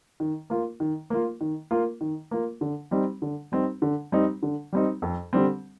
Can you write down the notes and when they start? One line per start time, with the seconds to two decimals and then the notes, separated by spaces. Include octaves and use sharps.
0.20 D#3
0.50 A#3 F4
0.80 D#3
1.10 A#3 F4
1.41 D#3
1.71 A#3 F4
2.01 D#3
2.31 A#3 F4
2.61 D3
2.91 G3 C4 D#4
3.22 D3
3.52 G3 C4 D#4
3.82 D3
4.12 G3 C4 D#4
4.43 D3
4.73 G3 C4 D#4
5.02 F2
5.33 D3 G3 C4